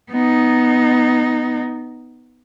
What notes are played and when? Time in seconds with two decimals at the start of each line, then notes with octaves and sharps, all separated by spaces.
0.10 B3 D#4